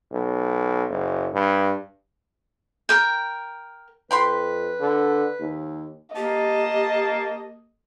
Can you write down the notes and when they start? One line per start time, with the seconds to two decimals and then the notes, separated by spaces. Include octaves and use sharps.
0.12 B1
0.89 F#1
1.33 G2
2.89 A#4 G5
4.11 F2 B4 G5 B5 C6
4.80 D3
5.40 D#2
6.16 A#3 G4 D#5 A5